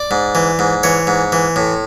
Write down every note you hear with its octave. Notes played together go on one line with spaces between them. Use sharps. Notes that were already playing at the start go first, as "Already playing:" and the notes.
Already playing: D5
G#2
E3
G#2
E3 C#5
G#2
E3
A2